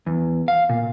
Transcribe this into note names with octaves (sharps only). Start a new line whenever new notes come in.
E2
F5
A#2